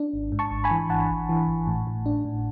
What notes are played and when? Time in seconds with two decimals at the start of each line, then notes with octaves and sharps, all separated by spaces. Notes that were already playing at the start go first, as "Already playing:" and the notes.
Already playing: D4
0.13 G#1
0.32 G#2
0.39 A5 C#6
0.51 G#1
0.64 G#5 B5
0.71 E3
0.90 G#1 F#5 A5
1.10 G#1
1.29 E3
1.48 G#1
1.67 A2
1.87 A2
2.06 D4
2.25 A2